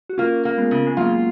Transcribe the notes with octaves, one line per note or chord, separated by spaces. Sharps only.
F#4
A#3 C#4 F4
A#3
G#3 B3
C#3
G#3
F#3 A#3 F4